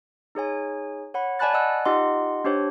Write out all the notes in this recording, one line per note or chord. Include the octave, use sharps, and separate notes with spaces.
D#4 G#4 C#5 G#5
C#5 F#5 B5
D5 G#5 A5 B5 F#6 A6
D5 D#5 F#5 G#5 E6 F#6
D#4 F4 G4 D#5 F#5 C6
D4 G4 C5 C#5